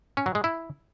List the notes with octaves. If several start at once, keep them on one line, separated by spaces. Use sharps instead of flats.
C#4
F#3
G#3
E4